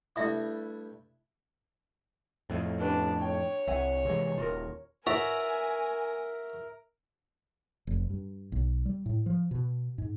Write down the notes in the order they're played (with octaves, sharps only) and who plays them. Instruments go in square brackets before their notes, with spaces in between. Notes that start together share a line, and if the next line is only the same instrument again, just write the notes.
[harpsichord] G2 A3 E4 [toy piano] E5 D#6
[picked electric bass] F2 A2
[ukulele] C#4 G4 B4 [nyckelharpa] D4
[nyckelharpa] C#5 [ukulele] G5
[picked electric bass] C2 [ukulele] E5 F#5 G#5
[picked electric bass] C3 E3 G#3
[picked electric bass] D#1 [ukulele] F4 F#4 A#4
[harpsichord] F#4 D5 A#5 [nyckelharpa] A#4 [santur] E5 [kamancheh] G#5
[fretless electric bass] F1
G2
B1
G3
A2
F3
B2
G#2